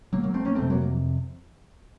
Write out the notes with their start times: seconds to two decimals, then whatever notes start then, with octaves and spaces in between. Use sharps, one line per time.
0.13 F#3 A#3
0.24 F#3 A#3
0.34 A3 C4
0.45 A#3 C#4
0.55 F2 C3 A3 C4
0.70 F#3 A#3